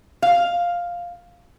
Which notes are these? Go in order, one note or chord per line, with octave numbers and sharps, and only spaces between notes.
F5